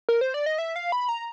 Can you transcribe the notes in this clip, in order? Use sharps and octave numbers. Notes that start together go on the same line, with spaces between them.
A#4
C5
D5
D#5
E5
F5
B5
A#5